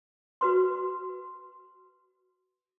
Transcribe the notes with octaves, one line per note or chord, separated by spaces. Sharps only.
F#4 B4 C6